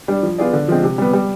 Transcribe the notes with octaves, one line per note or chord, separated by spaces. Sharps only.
G3 D4
F3
B3 F4 G#4 D5
D3
F3 G#3 C4
C3
G3 B3
G3